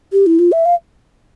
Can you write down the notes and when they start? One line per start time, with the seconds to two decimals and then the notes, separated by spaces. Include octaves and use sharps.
0.12 G4
0.26 E4
0.39 F4
0.52 E5
0.66 F5